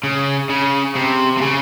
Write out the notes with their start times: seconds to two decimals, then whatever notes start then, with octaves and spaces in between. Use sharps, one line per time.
0.03 C#3
0.50 C#3
0.96 C3
1.37 C3
1.42 C#3